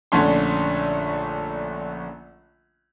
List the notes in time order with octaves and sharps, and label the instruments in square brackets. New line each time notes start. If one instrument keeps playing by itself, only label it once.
[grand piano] A#1 D3 A3 C#4 C6